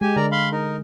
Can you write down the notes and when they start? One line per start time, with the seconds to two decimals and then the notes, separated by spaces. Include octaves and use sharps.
0.01 G#3 G4 G#5
0.16 D3 A#4 D5 A#5
0.32 F5 B5 C6
0.52 D#4 A#4